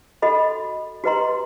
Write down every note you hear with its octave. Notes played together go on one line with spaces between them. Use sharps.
F#4 A4 D#5 B5
F#4 G4 B4 D#5 A#5 C6